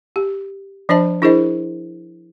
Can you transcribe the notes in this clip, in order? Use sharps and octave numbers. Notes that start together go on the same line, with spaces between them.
G4
F3 D4 C5 D#5 A5
D4 E4 G#4 A#4 C5 D#5